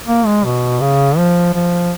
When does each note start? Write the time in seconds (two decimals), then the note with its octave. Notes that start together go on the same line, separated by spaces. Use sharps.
0.07 A#3
0.26 G#3
0.44 B2
0.81 C#3
1.17 F3
1.54 F3